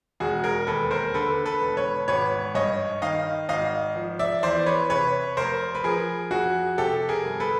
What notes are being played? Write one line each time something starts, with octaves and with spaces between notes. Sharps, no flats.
E1 F#4 G#4
G#4 A#4
D#2 A4 B4
A#4 C5
D3 A4 B4
A4 B4
E1
B4 C#5
G#1 B4 C#5
G2 C#5 D#5
D#3 D#5 F5
G#1 D#5 F5
F3
D5 E5
E2 C5 D5
B4 C#5
C3 B4 C#5
F1 A#4 C5
B4
F3 G#4 A#4
F2 F#4 G#4
C3 G4 A4
G#4 A#4
G1
A4 B4